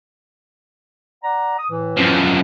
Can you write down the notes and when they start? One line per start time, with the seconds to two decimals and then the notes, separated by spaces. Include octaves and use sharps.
1.24 D5 F#5 A#5
1.59 D#6
1.71 A2 E3
1.97 F#2 F3